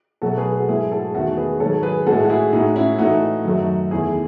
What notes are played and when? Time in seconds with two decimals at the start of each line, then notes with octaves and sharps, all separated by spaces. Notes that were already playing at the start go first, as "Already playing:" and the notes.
0.22 B2 F#3 A3 F#4 A4
0.37 G#4 B4
0.52 F#4 A4
0.68 G#2 F#3 A3 E4 G#4
0.91 F#4 A4
1.14 E2 D#3 A3 F#4 A4
1.37 G#4 B4
1.60 G#2 D#3 F#3 A4 C#5
1.83 G#4 B4
2.07 A2 G#3 F#4 A4
2.25 F#4
2.30 E4 G#4
2.53 A2 G#3 D#4 F#4
2.75 C#4 E4
2.98 A2 E3 A3 D#4 F#4
3.45 F#2 D#3 F#3 A3
3.91 E2 D#3 A3 E4 G#4